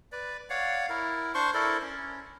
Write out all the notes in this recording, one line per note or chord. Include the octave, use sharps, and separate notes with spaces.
B4 D5
C#5 D5 F5 F#5
E4 A#4
D4 C5 C6 C#6
E4 A4 A#4 D5
C#4